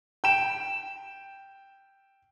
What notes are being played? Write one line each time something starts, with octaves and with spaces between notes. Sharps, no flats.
G5 E7